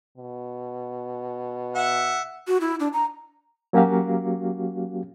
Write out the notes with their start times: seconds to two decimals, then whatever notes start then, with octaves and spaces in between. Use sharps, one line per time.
0.17 B2
1.75 E5 F#5
2.48 F#4
2.61 E4
2.80 D4
2.93 A#5
3.73 F#3 A#3 C#4 F#4 G4 F5